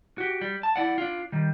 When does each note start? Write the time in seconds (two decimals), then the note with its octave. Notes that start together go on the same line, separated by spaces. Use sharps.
0.18 F#4 G4
0.41 G3
0.63 A5
0.76 E4 D5 F#5
0.98 D4 F4
1.32 D#3 G3